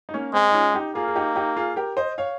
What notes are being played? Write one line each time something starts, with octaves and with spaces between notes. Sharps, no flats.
D#4
A#3 C#4
G#3 C4
D#4
C#4 F4
D#4 G4
A#3 F4 G#4
G#4
D#4 G4
D#4 G4
F4 G#4
G4 A#4
C5 D#5
C#5 F5